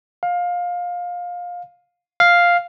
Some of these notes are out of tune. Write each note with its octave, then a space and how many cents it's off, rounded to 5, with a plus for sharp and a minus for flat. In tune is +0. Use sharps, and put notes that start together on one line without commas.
F5 +20
F5 +0